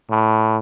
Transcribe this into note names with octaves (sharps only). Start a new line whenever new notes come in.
A2